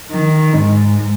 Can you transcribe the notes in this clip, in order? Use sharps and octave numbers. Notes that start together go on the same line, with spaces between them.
D#3
G#2